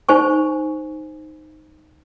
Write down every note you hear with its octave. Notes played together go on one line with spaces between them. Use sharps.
D#4 C5 G#5 C#6